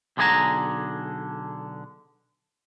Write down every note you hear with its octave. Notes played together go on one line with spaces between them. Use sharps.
B1 D3 G#4 D5 G#5 A#5